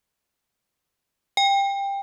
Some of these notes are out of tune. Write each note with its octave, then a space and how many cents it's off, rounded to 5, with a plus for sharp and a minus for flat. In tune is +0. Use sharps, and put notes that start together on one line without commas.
G5 +20